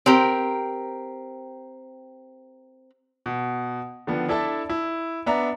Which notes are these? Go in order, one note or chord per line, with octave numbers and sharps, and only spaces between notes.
C4 G4 A#4
B2
D3 D#3 F3 B3
D4 E4 A4 E5 A5
E4
B3 D4 E5 A#5